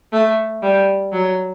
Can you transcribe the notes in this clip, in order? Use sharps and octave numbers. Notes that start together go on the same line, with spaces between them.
A3
G3
F#3